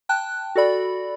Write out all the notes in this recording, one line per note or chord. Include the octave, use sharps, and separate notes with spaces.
G5 A5 F#6
F#4 A4 D5 B5